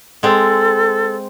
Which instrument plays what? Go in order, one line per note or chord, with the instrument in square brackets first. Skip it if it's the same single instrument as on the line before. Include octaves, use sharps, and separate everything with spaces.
[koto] G#3 C4 [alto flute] A4